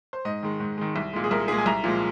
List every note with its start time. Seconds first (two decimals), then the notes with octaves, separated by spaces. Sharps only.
0.13 C5
0.25 G#2 D#5
0.43 D#3 G#3
0.60 G#2
0.78 D#3 G#3
0.96 C2
1.13 A#2 G#3
1.24 G#4
1.31 C2 A#4
1.48 A#2 G#3 G#4
1.58 G#5
1.66 C2 A#5
1.84 A#2 F3 G#3